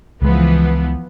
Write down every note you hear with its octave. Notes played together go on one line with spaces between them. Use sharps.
C#2 E3 F3 G#3 B3